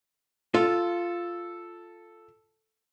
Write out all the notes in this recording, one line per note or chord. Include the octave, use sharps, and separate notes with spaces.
F4 A4